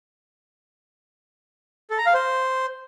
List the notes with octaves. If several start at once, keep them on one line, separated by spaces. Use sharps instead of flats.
A4
A#5
F5
C5